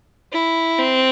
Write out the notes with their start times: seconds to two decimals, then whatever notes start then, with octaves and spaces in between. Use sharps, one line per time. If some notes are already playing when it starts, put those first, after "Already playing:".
0.32 E4
0.78 C4